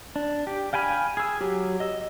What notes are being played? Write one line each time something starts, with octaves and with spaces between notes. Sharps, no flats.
D4
G4
F5 G5 G#5 B5 F6
G#4 E6
F#3 G4
D#5 E6